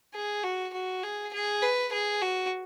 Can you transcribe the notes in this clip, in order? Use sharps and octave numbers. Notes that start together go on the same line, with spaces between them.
G#4
F#4
F#4
G#4
G#4
B4
G#4
F#4